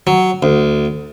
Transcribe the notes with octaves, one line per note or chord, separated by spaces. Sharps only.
F#3
D2